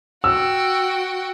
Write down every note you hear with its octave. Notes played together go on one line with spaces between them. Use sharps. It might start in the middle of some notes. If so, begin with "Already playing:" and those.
F#4 G5 E6